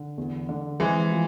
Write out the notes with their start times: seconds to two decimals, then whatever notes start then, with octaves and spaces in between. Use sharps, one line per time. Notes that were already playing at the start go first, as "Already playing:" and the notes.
Already playing: D3
0.18 E2
0.49 D3
0.80 E3 G#3 C4
1.12 F3